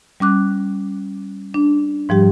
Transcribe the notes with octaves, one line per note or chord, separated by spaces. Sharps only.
G3 C#4 D6 F#6
D4
G#2 F3 G3 G4